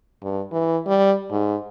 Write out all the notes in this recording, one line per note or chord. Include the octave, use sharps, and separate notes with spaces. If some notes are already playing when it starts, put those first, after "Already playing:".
G2
E3
G3
G#2